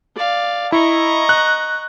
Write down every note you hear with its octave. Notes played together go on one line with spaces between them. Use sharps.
D5 F5
E4 D#5 A#5 C#6
F#6